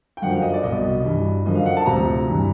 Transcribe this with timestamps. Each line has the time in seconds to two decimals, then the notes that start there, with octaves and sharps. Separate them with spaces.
0.17 G5
0.22 F#2 D3 F3 F#5
0.32 F5
0.42 D#5
0.54 D5
0.63 C2 B2 D#5
1.05 G2 E3
1.45 F#2 D3 F3 D#5
1.55 F5
1.65 F#5
1.77 A5
1.86 D2 C3 F3 A#5
2.28 G2 E3